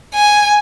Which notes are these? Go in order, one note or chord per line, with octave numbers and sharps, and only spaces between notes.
G#5